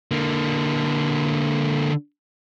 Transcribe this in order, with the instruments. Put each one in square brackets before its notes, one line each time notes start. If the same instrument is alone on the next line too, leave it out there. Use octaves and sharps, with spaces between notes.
[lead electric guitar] D3 A#3